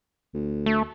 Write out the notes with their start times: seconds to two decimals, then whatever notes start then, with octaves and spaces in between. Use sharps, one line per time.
0.34 D2
0.66 A3